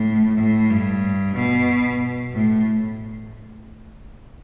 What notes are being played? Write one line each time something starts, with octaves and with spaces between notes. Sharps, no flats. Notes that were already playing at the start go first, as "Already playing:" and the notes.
Already playing: A2
A2
G2
B2
A2